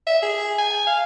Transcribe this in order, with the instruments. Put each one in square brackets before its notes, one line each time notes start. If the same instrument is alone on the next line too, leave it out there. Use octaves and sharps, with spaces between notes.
[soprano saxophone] E5
G#4
G#5
F5